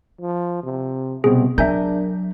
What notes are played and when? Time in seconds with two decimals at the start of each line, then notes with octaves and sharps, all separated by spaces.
0.21 F3
0.63 C3
1.24 C2 B2 C4 G#4
1.58 F#3 D4 A#4 E5 G#5 G6